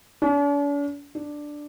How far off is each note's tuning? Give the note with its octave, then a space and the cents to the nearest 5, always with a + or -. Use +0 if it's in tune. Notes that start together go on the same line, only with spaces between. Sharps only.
D4 -45
D4 +5